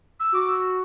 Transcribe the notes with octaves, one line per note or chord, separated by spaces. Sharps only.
E6
F#4 D6
E6